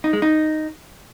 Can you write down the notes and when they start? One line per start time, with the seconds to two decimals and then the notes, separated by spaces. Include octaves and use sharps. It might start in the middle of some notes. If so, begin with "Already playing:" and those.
0.04 D#4
0.13 G#3
0.22 D#4